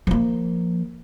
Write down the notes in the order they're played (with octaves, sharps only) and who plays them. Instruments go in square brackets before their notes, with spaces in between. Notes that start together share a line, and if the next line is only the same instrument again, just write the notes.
[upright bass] F3 A#3